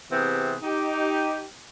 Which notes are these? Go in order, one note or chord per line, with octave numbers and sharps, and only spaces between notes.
C3 E3 B3 C4 G4 G#4
D#4 G4